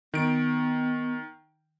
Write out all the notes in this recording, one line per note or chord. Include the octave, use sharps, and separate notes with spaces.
D#3 B3 D7